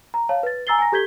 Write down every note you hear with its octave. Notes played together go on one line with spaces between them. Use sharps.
A#5
C#5 F5 A5
B4 A6
G#5 A#5 E6 A6 C7 G7
G#5 A#5 A#6
G4 A4 G6 G#6 B6 G7